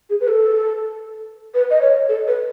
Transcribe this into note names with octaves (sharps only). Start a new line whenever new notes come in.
G#4
B4
A4
B4
D#5
C#5
A4
B4